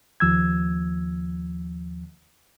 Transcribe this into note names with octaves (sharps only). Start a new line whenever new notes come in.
D#2 F3 E6 G#6